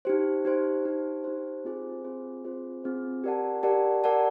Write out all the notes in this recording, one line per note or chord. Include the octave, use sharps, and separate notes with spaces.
D#4 G4 C5
D#4 G4 C5
D#4 G4 C5
D#4 G4 C5
C4 F4 G#4 C5
C4 F4 G#4 C5
C4 F4 G#4 C5
C4 F4 G#4 C5
G4 A#4 D5 F#5 A5
G4 A#4 D5 F#5 A5
G4 A#4 D5 F#5 A5